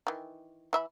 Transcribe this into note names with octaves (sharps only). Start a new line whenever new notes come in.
D#3 E3
E3 E5 B5